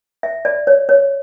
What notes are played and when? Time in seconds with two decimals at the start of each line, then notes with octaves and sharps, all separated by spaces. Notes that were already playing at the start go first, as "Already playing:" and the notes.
0.23 E5
0.45 D5
0.67 C#5
0.89 C#5